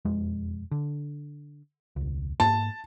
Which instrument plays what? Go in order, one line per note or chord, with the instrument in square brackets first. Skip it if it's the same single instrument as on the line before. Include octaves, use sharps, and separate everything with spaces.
[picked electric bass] E1 F2 G#3
D3
E1 C#2
[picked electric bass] G#2 A#3 [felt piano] A5